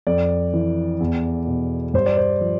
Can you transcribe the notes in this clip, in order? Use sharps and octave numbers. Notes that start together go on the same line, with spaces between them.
F2 D5
E3
E2
B2
G2 C5
D5
C5
F3